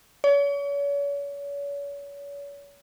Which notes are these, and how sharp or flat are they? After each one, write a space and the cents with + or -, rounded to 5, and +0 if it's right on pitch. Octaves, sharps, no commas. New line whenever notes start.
C#5 +40